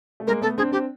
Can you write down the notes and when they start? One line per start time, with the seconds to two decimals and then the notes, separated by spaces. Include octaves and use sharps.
0.20 A3
0.27 G#3 A#3 A#4
0.42 A3 B3 A4
0.58 C4 D4 G#4
0.71 C4 D4 G4